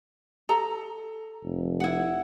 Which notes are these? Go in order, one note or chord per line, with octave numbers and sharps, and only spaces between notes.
A4 A#5
F1
E4 F#5